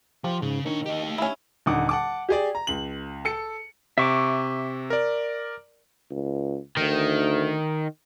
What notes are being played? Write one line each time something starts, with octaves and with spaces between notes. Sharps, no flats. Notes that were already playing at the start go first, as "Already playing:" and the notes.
F3 F4 G4 C5
G#2 C#3 C#4
A#2 D#3 D4 C#5
D#4 G4 D#5
A3
C#4 E4
D#1 D3 D#4 F#5 D6
F#5 A5 D6
G4 G#4 D5
A#5
C#2 F#7
A4 C#7
C3 E5 C#6 D6
A#4 D5
C#2
D2 D#3